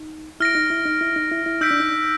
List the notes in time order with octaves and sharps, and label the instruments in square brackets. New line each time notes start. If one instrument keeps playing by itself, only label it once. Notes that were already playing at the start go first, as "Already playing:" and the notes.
Already playing: [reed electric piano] D#4
[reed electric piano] E4 [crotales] F6 A#6 D7
[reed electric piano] D#4
E4
D#4
E4
D#4
E4
E4
[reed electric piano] D#4 [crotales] E6 G6 B6 D7
[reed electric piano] D4
D#4